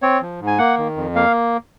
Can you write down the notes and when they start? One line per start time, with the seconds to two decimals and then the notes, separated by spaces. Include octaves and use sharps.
0.02 C4 C#5
0.22 F3
0.40 G#2
0.47 G#5
0.58 A#3 F#5
0.78 D#3
0.96 F2
1.15 A#3 F5